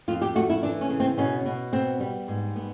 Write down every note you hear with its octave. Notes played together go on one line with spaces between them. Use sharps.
F2 F4
G4
A3 F#4
E4
E3 D4
C#4
C#3
C4
B2 C#4
B2
B3 C4
G3
G#2
B3